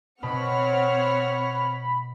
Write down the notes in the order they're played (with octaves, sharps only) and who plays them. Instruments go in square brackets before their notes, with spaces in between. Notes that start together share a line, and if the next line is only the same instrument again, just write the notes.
[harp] B2 [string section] C4 F#5 F6 [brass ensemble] C#5 [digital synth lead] B5